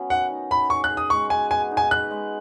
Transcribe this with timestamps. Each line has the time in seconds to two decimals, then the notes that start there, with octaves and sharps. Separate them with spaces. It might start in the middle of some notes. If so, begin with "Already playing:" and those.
Already playing: F#3 B3 C#4
0.10 D#3 F#5
0.30 D#4
0.51 D#4 B5
0.70 G#4 C#6
0.84 F#6
0.90 G#4
0.97 D#6
1.10 G#3 C#6
1.30 F#4 G#5
1.51 B3 G#5
1.71 D#4
1.77 G#5
1.91 B4 F#6
2.11 G#3